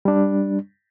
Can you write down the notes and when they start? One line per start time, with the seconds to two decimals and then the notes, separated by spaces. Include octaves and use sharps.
0.05 G3 D4